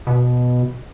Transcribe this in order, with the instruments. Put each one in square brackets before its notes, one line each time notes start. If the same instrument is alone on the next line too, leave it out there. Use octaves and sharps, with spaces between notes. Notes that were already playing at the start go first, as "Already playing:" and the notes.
[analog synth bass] B2